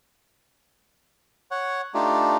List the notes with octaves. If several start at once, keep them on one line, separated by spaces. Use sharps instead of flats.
C#5 F#5
A3 D4 D#4 F4 G4